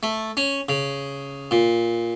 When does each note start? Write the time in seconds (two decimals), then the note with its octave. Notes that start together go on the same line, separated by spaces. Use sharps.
0.03 A3
0.37 C#4
0.69 C#3
1.51 A#2